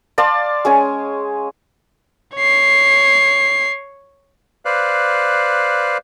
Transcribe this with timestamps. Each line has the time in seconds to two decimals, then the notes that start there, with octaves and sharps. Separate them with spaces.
0.18 D5 F5 A5 C6
0.65 G#3 C#4 G#5
2.36 C#5 C7
4.65 B4 C5 D5 F5 F#6